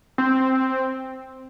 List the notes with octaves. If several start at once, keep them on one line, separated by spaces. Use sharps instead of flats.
C4